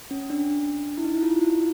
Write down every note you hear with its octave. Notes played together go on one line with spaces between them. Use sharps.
C#4
D4
E4
D#4
E4
F4
F4
E4